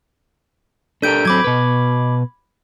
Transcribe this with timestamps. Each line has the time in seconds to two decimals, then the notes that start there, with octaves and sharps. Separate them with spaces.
1.02 D4 G4 A4 A#4 G6 D7
1.25 F#3 C4 B5 D6 G#6
1.44 B2 B4